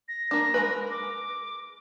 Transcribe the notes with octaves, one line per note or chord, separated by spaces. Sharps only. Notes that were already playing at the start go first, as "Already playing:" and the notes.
A#6
A#3 D4
G#3 A#4 B4
D6